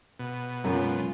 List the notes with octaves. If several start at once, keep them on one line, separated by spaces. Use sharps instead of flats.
B2
F#2 C#3 G#3 F4